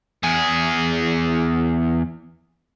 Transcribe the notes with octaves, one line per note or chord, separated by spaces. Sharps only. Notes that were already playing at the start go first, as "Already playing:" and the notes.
E2 G#4